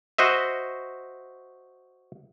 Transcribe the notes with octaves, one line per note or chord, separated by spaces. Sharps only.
F#4 C5 D#5 E5